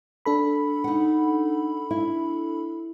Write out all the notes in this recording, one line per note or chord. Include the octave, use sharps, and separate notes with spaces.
D4 A4 B5
D#4 F#5
E4